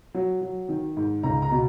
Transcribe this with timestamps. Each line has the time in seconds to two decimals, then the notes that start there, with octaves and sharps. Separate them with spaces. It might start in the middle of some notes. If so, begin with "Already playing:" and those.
0.14 F#3
0.41 F#3
0.69 D#3
0.97 G#2
1.23 C#2 A#5
1.42 A#5
1.51 B2